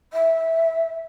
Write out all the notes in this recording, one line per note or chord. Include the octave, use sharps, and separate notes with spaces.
E5